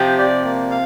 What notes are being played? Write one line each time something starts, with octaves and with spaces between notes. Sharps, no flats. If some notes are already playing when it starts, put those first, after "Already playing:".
Already playing: C3 F3 G4
D5
A#3
F5